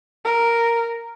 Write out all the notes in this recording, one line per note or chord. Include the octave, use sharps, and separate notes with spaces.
A#4